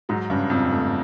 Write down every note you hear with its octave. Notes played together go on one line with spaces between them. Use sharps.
G#2 F#3
G2 C#3
F2 C#3
A3